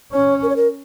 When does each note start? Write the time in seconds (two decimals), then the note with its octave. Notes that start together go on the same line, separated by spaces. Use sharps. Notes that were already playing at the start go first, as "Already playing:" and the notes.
0.12 C#4 C#5
0.42 A#4
0.49 C#5
0.56 A#4